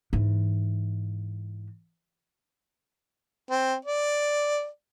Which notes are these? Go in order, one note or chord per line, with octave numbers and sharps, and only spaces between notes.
G#2 E3
C4
D5